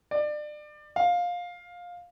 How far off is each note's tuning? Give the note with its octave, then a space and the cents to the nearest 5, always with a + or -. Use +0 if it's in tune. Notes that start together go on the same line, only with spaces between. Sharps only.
D5 +30
F5 +15